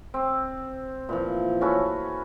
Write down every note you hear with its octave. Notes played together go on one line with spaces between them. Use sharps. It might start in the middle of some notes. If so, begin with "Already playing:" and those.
C4
A#2 E3 F3
C#4 F#4 A4 B4